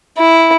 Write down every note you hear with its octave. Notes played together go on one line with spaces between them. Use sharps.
E4